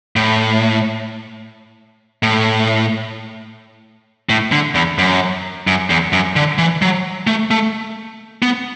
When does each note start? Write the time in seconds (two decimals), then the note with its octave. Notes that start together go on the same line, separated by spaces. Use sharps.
0.16 A2
2.23 A2
4.29 A2
4.52 D3
4.75 E2
4.98 F#2
5.67 F#2
5.90 E2
6.13 F#2
6.36 D3
6.58 E3
6.82 F#3
7.27 A3
7.51 A3
8.42 B3